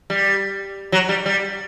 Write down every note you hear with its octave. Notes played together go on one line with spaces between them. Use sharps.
G3
F#3
G3
G3